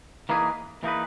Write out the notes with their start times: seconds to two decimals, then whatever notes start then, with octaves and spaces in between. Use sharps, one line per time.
0.29 E3 A#3 D#4 G#4 B4
0.83 E3 A#3 D#4 G#4 B4